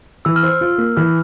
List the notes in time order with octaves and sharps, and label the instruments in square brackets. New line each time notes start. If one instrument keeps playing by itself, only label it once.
[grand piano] E3 [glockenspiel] E6
[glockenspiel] F6
[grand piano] C5 [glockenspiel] E6
[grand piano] F4
A#3
[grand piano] E3 [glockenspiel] F6